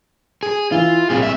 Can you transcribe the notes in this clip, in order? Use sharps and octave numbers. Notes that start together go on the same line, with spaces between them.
G#4
E3 F4
C2 A#2 G#4
A2 E5